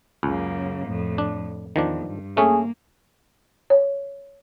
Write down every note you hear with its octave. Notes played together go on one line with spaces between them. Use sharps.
C#2 F#2 C#3 A#3
F2 A2
D4
E2 D#3 F3 D4
G2
A3 A#3 C#4 G#4
C#5